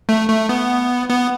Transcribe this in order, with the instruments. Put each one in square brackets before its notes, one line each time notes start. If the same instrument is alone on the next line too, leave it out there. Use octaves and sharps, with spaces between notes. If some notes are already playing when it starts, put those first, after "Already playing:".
[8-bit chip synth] A3
A3
B3
B3